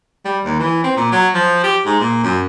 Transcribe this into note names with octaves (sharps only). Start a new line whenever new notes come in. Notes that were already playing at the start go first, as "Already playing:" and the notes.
G3
D#2
E3
C4
A#2
F#3
F3
G4
G#2
A#2
F#2